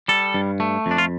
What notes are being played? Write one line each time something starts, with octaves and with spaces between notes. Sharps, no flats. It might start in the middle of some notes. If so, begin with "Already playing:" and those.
G3 A4
G2
A3
F2
D4
F4